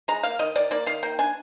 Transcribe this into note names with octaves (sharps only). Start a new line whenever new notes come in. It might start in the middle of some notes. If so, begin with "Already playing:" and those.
G#3 A#5
A#3 F5
D#3 D#5
D#3 D5
A#3 D5
D#3 F5
A#3 G5
D4 G#5